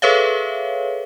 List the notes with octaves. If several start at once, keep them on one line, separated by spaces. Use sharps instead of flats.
G#4 A4 B4 C#5 E5 F5